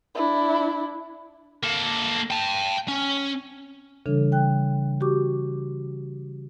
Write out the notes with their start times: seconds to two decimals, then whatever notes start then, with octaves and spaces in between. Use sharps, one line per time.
0.15 D4 E4
1.63 A#3 A4
2.31 G5 A5
2.88 C#4
4.06 C#3 E3 G3 D4 A4
4.32 G3 G5 F#6
5.01 F#4 G4 C#6 D6